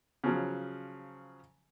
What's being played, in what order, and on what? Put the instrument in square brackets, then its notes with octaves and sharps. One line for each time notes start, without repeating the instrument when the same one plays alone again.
[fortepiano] C#3 F3 F#3